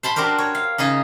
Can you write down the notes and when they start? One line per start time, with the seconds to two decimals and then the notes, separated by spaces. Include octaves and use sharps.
0.03 C5 A5 B5 C6
0.16 D4 F#4 G4 A#4 C5
0.38 C#5
0.55 F5
0.78 C#3 D#4 G#4 D#5